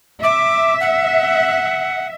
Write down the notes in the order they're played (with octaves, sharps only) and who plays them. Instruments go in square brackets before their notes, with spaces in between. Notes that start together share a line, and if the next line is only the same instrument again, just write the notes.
[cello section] E5 [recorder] D6
[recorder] F#5